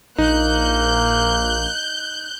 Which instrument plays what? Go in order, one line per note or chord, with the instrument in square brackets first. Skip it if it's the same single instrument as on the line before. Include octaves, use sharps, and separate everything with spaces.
[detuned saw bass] A#1 [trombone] A#3 [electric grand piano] D#4 [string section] F#6 G6